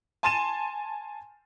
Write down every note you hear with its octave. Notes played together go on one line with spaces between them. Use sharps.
G#5 A5 C6 A6 D#7 E7